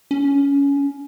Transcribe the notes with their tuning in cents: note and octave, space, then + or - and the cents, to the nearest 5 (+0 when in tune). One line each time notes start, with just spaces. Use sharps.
C#4 +20